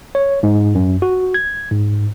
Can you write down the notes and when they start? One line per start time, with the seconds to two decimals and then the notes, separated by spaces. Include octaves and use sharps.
0.15 C#5
0.43 G#2
0.75 F#2
1.02 F#4
1.34 G#6
1.71 G#2